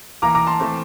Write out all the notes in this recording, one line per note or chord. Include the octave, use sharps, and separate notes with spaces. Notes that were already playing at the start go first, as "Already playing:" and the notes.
E3 A#3 A#5 D6
A#5 D6
A5 C6
E3 A3 C4